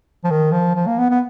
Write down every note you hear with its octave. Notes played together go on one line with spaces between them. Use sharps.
F3
D#3
F3
F3
A#3
B3
B3